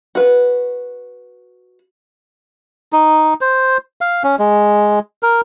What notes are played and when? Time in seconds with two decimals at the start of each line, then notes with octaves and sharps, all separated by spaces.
0.15 F#4 B4
2.93 D#4
3.41 C5
4.01 F5
4.24 C#4
4.39 G#3
5.23 A#4